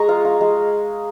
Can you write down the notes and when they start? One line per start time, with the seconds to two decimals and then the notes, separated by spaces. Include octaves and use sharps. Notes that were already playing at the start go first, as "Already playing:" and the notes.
Already playing: G#3 G#4 D#5 A#5 C#6
0.09 F4 F5
0.25 F4
0.41 G#3